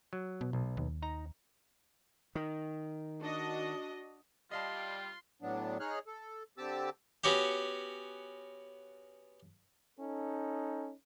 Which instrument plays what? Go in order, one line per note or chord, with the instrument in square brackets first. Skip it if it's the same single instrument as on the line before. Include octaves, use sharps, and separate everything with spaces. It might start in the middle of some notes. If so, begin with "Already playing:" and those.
[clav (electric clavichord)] F#3
[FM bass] B2
[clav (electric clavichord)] B1
[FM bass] D#2
[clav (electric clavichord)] D#4 A#5
[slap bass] D#3
[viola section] D4 F#4 D#5
[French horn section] G3 [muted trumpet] F4 [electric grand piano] D#5 F5 A5 [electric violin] C6
[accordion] A2 F#3 B3 D4
D#4 G#4 C#5 F6 F#6
A4
D3 C4 G4 A5 D6 E6
[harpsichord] B3 C#4 F#4 G4
[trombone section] C#4 D#4 A4